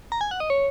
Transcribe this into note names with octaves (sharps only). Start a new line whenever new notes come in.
A#5
G#5
F#5
D#5
C#5